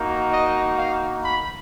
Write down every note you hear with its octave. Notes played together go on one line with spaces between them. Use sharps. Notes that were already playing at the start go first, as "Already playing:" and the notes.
Already playing: A#3 D#4 F#4
D#5
F5
B5